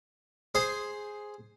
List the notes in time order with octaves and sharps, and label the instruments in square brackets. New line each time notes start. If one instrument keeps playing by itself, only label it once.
[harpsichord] G#4 C5